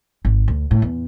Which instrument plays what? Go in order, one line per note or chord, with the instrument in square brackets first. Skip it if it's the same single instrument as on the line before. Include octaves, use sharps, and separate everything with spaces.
[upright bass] G#1
D2
A2
E2